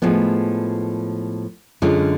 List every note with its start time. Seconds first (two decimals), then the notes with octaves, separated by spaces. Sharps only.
0.02 A2 F3 G#3 B3
1.82 F#2 D3 G#3 C#4 F4